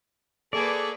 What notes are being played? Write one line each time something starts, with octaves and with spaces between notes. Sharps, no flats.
A#3 G#4 A4 B4 D5 C#6